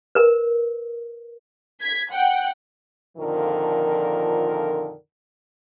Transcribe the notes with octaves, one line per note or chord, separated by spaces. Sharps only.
A#4 B4
G#6 B6
F#5 G5
F2 A#2 D3 D#3 F3 A#4